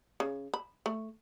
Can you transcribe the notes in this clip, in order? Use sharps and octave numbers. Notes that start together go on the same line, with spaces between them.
C#3
B5
A3